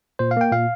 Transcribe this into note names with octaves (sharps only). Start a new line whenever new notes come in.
A#2 C5
F5
A#3 G5
A#2 F5